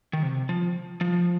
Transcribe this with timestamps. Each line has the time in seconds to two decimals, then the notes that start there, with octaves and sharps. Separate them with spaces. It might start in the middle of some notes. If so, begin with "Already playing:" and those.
0.13 D#3
0.23 C3
0.49 F3
1.01 F3